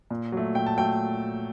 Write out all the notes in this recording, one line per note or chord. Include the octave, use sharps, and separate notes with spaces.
A#2
F#3 A3
A#2 G5
A5
F#3 A3 G5